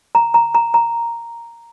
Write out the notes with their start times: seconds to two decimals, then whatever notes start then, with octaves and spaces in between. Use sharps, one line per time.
0.15 A#5
0.34 A#5
0.55 A#5
0.74 A#5